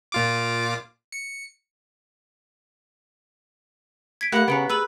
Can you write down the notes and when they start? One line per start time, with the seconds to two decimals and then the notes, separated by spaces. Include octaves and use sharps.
0.12 A#2 F4 D6
1.12 C#7
4.21 G#6 B6 D7
4.32 A3 A#3 G4 F#5 B5 F#6
4.48 C#3 B3 A#5 C#7 D7
4.70 G#4 B4 E6 D#7 F#7